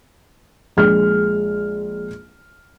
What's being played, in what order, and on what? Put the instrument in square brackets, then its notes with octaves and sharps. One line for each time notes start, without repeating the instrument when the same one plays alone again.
[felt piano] A#1 G#3 F6